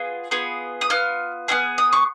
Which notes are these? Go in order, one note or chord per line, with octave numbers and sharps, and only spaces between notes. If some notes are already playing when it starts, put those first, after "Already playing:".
Already playing: B3 F4 G#4
B3 F4 G#4
D#6
B3 F4 F6
B3 F4 G#4 F6
D#6
C#6